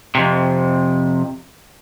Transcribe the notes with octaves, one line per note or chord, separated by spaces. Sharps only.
F2 C3